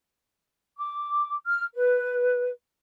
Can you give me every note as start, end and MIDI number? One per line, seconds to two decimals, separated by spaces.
0.78 1.35 86
1.47 1.64 89
1.74 2.49 71